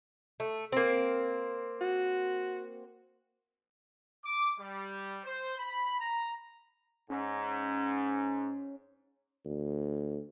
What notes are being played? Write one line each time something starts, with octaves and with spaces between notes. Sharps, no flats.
A3
A#3 C4
F#4
D6
G3
C5
B5
A#5
G#2 C#4
D2